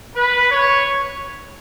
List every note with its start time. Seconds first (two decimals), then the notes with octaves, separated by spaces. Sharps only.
0.16 B4
0.51 C#5